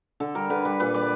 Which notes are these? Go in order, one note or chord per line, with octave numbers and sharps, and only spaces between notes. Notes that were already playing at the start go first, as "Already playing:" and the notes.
D3 A4
G3 A#4
D3 B4
G3 B4
A#2 B4
G3 D5